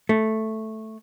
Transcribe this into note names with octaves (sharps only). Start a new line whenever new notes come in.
A3